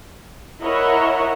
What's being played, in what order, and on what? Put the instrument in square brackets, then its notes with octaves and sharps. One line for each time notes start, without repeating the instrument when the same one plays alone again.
[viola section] E4 A#4 C#5 D#5 E5 F#5